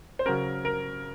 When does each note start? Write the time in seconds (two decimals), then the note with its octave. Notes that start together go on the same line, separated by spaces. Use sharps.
0.19 C5
0.26 C#3 F#3 C#4 A#4
0.65 A#4